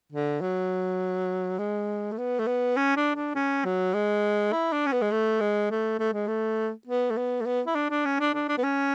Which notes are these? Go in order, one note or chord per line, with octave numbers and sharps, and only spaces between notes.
D3
F#3
G#3
A3
B3
A3
B3
C#4
D4
D4
C#4
F#3
G#3
E4
D4
C#4
B3
G#3
A3
G#3
A3
A3
G#3
A3
B3
A3
B3
A3
B3
E4
D4
D4
C#4
D4
D4
D4
B3
C#4